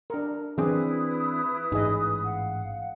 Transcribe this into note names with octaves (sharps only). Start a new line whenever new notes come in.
D4 A#4
E3 C4 D4 E4 G#4 B4 D#6
A1 G#2 D#4 G#4 D#5
F5 F#5